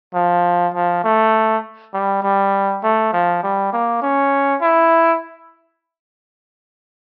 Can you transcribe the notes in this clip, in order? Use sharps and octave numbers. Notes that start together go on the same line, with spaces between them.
F3
F3
A3
G3
G3
A3
F3
G3
A#3
C#4
E4